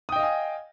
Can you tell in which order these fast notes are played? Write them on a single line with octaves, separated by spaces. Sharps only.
D#6 G5 D#5 F5 G#5